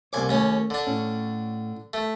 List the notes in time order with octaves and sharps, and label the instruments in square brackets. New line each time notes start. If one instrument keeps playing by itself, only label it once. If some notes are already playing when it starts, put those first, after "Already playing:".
[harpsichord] C2 G#5 D6 [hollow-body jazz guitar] A#3 C#5
[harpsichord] D#2 C#4 [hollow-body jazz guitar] A3
[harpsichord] D3 D4
[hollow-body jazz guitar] A2 C#4
[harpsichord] A3